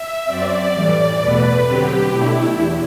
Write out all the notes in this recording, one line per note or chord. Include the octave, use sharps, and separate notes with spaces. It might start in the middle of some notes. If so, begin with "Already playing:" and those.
Already playing: E5
F#2 F#3 C4 D5
A2 E3 G3
E2 B2 A3 B4
D3 F#3 C4 G4
B2 A3 D4 E4
E2